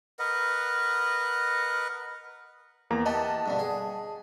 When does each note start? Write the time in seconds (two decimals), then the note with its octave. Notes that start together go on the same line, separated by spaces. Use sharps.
0.19 A#4 B4 D#5 F#5
2.90 E2 A#3 A#5
3.06 E3 G4 D#5 F#5 A5
3.46 G2 B2 D3
3.59 G#4